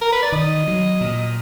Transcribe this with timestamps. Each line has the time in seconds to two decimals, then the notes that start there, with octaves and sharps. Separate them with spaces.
0.01 A#4
0.12 B4
0.22 D5
0.32 D#3 D#5
0.67 F#3
1.01 A#2